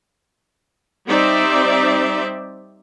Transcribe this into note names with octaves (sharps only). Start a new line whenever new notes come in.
G3 C4 D#4 C5 D5 E5